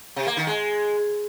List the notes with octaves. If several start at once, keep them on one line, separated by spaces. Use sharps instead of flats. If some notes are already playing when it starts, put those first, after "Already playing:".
C3
A#3
D#3
G#3